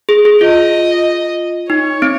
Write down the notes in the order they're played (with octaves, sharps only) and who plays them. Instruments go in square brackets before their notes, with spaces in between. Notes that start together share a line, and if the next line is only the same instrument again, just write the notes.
[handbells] G#4
G#4
[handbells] F4 [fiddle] D#5
[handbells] D#4 [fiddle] C#5
[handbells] C4